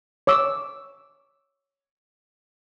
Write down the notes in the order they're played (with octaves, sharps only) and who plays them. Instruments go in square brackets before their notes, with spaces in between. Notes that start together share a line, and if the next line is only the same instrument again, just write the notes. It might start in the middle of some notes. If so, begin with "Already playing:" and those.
[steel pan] C#5 D6 E6